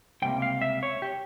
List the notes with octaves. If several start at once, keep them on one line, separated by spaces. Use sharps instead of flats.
C#2 C3 G3 A#3 G5
F5
E5
C#5
G4